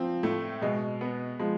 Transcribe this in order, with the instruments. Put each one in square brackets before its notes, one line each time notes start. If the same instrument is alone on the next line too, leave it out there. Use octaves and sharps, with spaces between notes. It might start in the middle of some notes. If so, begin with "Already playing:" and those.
Already playing: [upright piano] F3 [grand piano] C4
[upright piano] A2 [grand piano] A3
[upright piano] B2 [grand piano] G#3
[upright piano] B3
[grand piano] F3 [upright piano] G#3